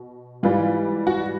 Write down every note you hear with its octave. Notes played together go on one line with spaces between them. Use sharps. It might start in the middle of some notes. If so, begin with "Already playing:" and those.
Already playing: B2
G#2 E3 G3 F4
F#4